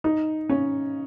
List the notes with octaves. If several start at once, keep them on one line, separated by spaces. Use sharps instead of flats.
D#4
C#4